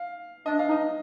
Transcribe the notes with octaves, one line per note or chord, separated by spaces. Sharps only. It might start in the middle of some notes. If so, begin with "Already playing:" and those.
Already playing: F5
D4 D#5
F5
D#4
D#5